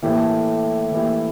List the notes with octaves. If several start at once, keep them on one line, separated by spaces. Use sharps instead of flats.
A2 E3 A#3 E4 G4
E3 A#3 E4 G4